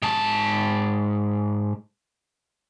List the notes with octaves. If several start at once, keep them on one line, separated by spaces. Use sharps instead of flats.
G#2 A5